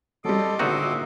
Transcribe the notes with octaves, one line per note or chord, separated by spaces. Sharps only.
F#3 G3 A4 D#5 C6 D6
G#1 A#2 D3 C4 D#4 F#4 E5